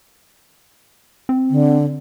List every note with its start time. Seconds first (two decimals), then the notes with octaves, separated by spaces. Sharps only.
1.29 C4
1.50 D3